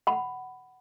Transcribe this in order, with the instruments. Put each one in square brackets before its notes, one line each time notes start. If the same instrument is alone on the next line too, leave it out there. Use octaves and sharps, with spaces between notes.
[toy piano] F#5 B5